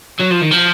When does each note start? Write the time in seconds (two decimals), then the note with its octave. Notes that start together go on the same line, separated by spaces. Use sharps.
0.19 F#3
0.30 F3
0.41 D#3
0.51 F3